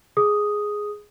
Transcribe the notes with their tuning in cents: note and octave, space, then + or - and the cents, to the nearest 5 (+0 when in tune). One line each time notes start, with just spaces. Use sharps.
G#4 +0 D#6 +0